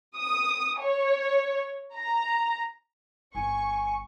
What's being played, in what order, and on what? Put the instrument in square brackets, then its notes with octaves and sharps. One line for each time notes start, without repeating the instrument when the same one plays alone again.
[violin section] D#6
C#5
A#5
[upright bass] G1 [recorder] G#5 [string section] C#6